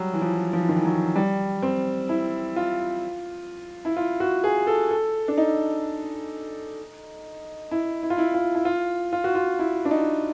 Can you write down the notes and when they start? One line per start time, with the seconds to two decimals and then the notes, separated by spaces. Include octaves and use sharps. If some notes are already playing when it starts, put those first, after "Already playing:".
Already playing: F#3 G3
0.13 E3
0.22 F3
0.53 F3
0.60 E3
0.69 D#3
0.76 E3
0.85 F#3
1.16 G3
1.62 C4
2.09 E4
2.56 F4
3.85 E4
3.97 F4
4.20 F#4
4.44 G#4
4.67 A4
4.91 A4
5.28 D4
5.37 D#4
7.71 E4
8.03 E4
8.10 F4
8.18 E4
8.34 F4
8.55 E4
8.65 F4
9.13 F4
9.24 F#4
9.35 F4
9.59 E4
9.85 D4
9.91 D#4